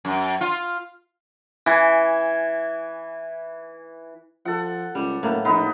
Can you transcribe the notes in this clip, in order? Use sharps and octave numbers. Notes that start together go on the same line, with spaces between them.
F#2
F4
E3 G#5
F3 A4 F#5
C#2 G3
F#1 A2 A#3 B3
A#1 B3 D#4 F4 A4 B4